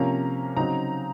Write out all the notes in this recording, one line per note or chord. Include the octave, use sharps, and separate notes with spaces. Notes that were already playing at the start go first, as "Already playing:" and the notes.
Already playing: C3 F3 A#3 C#4 A#5
C#3 F#3 C4 D#4 A#5